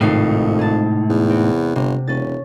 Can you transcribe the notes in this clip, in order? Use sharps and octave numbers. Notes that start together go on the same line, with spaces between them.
G#1 F2 A2 C3 D#4 C7
G#4 A5
E2
C4 F#5
G1 C3
E1 C#4 A6